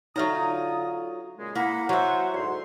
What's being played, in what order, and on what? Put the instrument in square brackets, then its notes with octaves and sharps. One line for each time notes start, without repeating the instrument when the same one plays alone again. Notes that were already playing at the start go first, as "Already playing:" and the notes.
[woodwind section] D3 D#6 [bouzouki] F#3 F4 A#5 [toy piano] D#4 C#5 E5
[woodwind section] A#2 C#3 G#3
[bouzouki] A#3 [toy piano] E4 [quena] F#5 [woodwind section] B5
[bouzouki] F#3 E5 [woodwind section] C5
[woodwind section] G#2 D3 C6 [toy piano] F#4 C5 D5